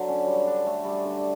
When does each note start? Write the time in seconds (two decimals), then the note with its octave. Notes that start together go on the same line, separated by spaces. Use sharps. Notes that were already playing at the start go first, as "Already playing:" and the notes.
Already playing: D3 F#3
0.08 C#4
0.27 G3
0.47 D4
0.66 A3
0.85 G3
1.05 D3